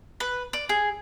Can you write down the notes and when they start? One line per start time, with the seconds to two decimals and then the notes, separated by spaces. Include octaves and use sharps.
0.20 B4
0.53 D5
0.69 G#4